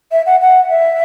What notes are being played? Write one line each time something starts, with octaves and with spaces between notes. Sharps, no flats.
E5
F#5
F#5
E5